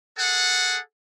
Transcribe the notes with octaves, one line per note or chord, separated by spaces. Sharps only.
G#4 A4 F#5